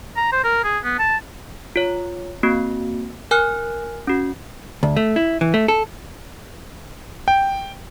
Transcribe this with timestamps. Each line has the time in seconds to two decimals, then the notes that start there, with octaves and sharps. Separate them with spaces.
0.16 A#5
0.32 C5
0.44 A#4
0.64 G#4
0.84 B3
0.99 A5
1.76 F4 C#5
2.43 A#3 C4 F#4
3.31 A#4 G#5 F6 F#6
4.07 C#4 F#4
4.83 D2
4.97 A3
5.16 E4
5.41 E3
5.54 A3
5.68 A4
7.28 G5